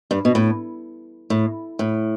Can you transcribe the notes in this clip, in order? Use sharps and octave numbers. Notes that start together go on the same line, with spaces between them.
G2
B2
A2
A2
A2